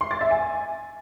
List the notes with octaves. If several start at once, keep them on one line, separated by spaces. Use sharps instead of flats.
C6
A6
E5
G#5